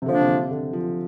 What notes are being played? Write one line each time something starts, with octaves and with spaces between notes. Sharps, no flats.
C3
D3 F3 A#3 D4
C3
D3
D3
F3